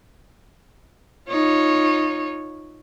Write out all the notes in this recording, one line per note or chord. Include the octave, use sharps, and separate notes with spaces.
D#4 F4 C#5